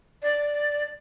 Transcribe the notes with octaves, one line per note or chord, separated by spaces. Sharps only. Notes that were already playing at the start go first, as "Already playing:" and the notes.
D5